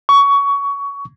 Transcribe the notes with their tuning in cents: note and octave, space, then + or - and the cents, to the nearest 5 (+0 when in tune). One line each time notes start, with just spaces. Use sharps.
C#6 +20